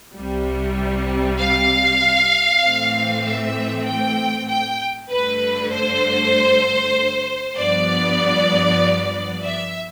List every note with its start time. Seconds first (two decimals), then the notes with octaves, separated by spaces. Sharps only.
0.16 C2 C3 G3
1.39 F5
2.62 A2 E3 A3 C4
3.25 E5
3.86 G5
4.48 G5
5.10 G2 D3 A3 B4
5.72 C5
7.57 G2 F3 B3 D5
9.44 E5